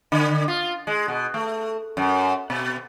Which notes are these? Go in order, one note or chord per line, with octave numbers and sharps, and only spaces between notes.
D3
F4
G#3
B2
A3
F#2
B2